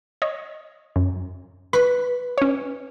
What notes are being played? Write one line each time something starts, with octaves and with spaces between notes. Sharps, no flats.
C#5 D#5
F#2
B4 B5 C#6 B6
C#4 C#5